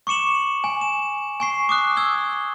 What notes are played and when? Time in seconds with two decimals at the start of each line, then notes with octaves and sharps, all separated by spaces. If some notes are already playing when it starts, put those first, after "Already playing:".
0.07 C#6 D6 C#7 E7 F#7
0.64 G#5
0.81 E7
1.40 G#5 C#6 C7
1.69 D6 D#6 F#6
1.97 E6 G#6 G7